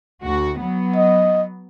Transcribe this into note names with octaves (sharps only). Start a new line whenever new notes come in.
D2 F#4
F#3 B3
D#5